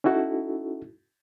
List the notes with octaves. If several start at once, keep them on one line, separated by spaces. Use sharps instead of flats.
C#4 D#4 E4 F#4 A4